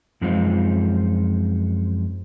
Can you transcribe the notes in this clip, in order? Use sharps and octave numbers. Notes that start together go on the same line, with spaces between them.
F#2 F3 G#3 C4 D#4 F4